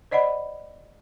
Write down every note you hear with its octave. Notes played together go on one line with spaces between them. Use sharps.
C5 D5 D#5 F#5 B5